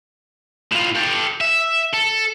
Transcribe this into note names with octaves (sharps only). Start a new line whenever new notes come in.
A2 F4
G4 A4
E5
A4